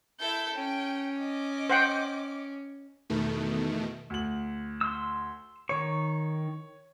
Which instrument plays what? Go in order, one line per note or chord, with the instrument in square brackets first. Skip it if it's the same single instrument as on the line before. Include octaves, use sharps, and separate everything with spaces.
[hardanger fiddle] E4 A4 [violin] E5 G6
[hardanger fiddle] C#4 [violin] G5
[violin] D#5 D6
[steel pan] C5 F#5 G5
[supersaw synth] E2 B2 D#3 A3
[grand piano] D2 F#7
[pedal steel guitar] C6 E6
[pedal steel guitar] D#3 C#6 [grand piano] C#5